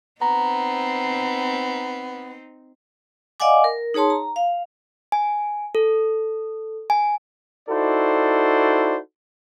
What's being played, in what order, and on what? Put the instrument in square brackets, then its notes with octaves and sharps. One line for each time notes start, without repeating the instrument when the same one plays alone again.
[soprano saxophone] B3 [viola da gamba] C4 D#4 [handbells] A#5
[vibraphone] D5 D#5 F5 F#5 G#5 D6
A#4
D#4 G#4 C#5 A5 C6
A#5
F5
[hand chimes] G#5
A4
G#5
[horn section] D#4 E4 F#4 A4 C5 D5